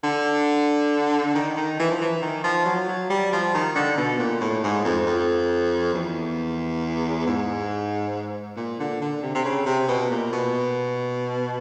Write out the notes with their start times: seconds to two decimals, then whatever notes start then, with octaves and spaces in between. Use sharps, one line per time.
0.04 D3
1.35 D#3
1.57 D#3
1.79 E3
1.91 F3
2.01 E3
2.22 D#3
2.44 F3
2.66 F#3
2.88 F#3
3.10 G3
3.33 F3
3.54 D#3
3.76 D3
3.97 B2
4.19 A#2
4.41 A2
4.64 G#2
4.85 F2
5.07 F2
5.94 E2
7.27 G#2
8.57 A#2
8.80 D3
9.02 D3
9.23 C3
9.35 C3
9.45 C#3
9.66 C3
9.88 B2
10.11 A#2
10.33 B2